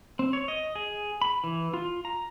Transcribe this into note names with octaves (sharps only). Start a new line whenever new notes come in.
C4
C#5
D#5
G#4
B5
E3
F4
A#5